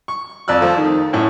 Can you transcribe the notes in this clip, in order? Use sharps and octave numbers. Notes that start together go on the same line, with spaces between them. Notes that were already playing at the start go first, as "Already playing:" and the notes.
C#6
F2 D5 E6 F#6
F3 A3
D#3
F#2 A2